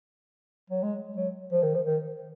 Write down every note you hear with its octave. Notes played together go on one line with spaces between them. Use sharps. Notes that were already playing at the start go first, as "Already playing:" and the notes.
F#3
G#3
F#3
F3
D#3
F3
D#3